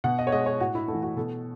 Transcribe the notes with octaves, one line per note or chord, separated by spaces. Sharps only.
B2 F#5
D#5
C#5
G#3 D#5
C#5
A2 F#4
E4
A3 E4
E3
F#4
B2 A4